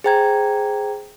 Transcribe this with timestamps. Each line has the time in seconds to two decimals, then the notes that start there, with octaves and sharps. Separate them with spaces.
0.04 G#4 C5 G5 A#5 G#6